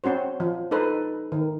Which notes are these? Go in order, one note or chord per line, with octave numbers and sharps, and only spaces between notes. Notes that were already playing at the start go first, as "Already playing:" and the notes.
C4 C#4 F#4 C5
F3
D#4 A4 B4 C5
D#3